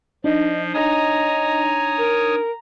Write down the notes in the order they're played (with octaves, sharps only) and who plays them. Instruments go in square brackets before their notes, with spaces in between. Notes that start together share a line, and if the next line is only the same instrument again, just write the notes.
[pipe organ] F3 [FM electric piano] D4 D#4 [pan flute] D#5
[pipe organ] C#5 G#5 D#6 [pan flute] D#5 [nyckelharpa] A#5
[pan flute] A#4